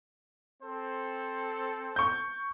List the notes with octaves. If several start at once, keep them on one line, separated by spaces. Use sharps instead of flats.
C4 A4 C5
C#6 G6